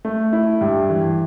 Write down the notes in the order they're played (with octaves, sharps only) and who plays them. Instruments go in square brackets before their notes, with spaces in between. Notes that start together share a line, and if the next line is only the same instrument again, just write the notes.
[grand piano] A3
E4
G2
E3